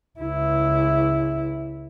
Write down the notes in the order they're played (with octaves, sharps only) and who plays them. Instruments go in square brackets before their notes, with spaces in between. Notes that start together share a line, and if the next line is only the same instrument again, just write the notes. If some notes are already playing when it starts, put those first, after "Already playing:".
[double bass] C#2 E4